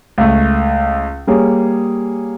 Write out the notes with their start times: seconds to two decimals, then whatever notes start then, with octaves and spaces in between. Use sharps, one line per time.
0.18 C#2 A3
1.27 G3 A#3 G#4 C#5